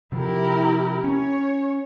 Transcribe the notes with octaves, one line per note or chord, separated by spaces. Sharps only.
C3 F3 E4 G4 A#4
C#4 C#5